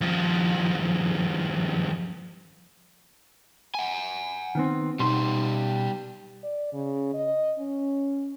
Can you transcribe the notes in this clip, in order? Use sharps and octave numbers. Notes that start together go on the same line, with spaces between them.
D#2 F3
F#5 G#5
D#3 B3 C4
B2 G3 D#4 C6
D5
C#3
D#5
C#4